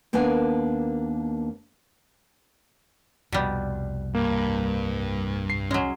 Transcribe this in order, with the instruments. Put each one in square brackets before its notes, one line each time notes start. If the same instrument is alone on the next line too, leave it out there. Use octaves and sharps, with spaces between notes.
[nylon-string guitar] D#2 A#3 B3 D4 B4 G#5
[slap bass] C2 F2 [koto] B2 G3
[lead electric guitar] G2 [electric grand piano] A#3
[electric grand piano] C7
[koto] F#3 G#3 [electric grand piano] C#4